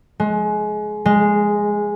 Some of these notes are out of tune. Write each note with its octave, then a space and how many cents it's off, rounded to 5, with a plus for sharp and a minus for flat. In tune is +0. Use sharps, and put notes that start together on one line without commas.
G#3 +25
G#3 -5